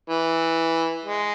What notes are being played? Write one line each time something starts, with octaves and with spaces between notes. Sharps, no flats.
E3
G#3